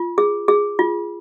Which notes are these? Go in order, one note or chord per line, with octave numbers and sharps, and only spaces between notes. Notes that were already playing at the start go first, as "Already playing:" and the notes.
Already playing: F4
G#4
G#4
F4